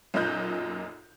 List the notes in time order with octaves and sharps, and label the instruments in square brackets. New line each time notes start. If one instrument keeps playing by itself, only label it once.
[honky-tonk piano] B1 F#2 A#2 D#5 F#6 G6